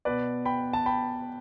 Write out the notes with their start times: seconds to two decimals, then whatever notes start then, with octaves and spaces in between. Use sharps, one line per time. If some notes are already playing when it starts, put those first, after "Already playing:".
0.05 B2 B4 D5
0.45 G5 B5
0.73 A5
0.86 G5 B5